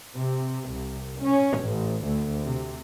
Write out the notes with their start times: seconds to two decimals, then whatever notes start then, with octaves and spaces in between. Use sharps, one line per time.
0.15 C3
0.71 C2
1.20 C#4
1.62 A1
2.04 D2
2.44 C3